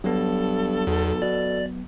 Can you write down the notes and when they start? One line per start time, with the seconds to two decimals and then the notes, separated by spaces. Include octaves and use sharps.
0.04 G2 F#3 B3 A4
0.87 B1 E2
1.22 B2 D5